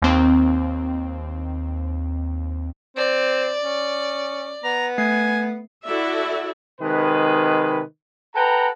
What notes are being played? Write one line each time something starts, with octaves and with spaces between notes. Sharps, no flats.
D#2 C4
C4 D5
C#4
B3 A#5
A3 G#5 C7
E4 F#4 A4 D5 E5
C3 D#3 G#3 B4
A4 B4 F#5 G5 A#5